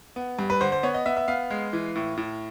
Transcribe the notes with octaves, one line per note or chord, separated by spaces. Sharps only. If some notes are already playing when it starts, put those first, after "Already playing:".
B3
G2
B4
D3 C5
C5
B3 C#5
D#5
B3 E5
E5
B3 F5
G#3
E3
A2
A2